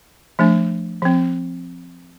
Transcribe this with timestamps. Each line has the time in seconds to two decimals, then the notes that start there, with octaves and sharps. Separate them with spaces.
0.39 F3 A3 D4
1.02 F3 C4